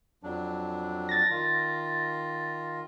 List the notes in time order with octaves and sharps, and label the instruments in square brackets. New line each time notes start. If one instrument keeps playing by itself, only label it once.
[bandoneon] F2 F#3 D4
[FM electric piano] A6 A#6
[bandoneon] D#3 F4